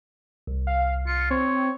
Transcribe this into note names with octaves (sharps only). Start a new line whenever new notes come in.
C2
F5
F4 C#7
C4 C#5